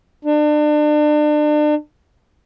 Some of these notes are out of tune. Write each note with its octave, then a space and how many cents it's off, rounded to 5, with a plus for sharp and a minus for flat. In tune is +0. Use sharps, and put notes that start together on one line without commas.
D4 +35